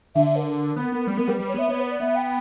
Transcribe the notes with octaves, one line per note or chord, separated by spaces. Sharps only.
D3 E5
E5
A#4
B3
B3
G3
B3 A#4
G3 B4
G3 B4
C#5
B3 E5
B3 C#5
B4
D5
B3 E5
G5